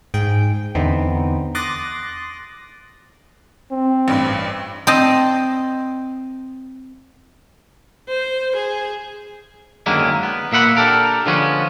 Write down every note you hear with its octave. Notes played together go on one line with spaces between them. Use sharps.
G#2 G#4 G5
E2 D3 B3 C4 D#4
C6 D6 D#6 F#6 A6 A#6
C4
A1 G2
C4 C5 D#5 A5
C5
G#4
F#2 D3 D#3 G#3 A#3 E4
B3
A#2 A#3 E5 F#5 B5
D4 G4 A4 A#4
D3 F3 G#3 B3 C#4